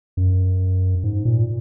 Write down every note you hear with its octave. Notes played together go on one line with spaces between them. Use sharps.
F#2
G#2
A#2